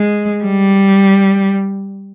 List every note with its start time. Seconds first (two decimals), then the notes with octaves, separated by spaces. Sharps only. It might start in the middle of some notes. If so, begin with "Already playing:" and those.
Already playing: G#3
0.44 G3